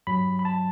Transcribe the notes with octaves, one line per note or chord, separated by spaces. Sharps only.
G2 F#3 B5
B5
A5